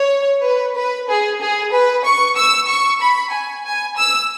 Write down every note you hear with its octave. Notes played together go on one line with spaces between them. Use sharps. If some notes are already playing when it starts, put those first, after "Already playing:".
Already playing: C#5
B4
B4
G#4
G#4
B4
C#6
E6
C#6
B5
G#5
G#5
E6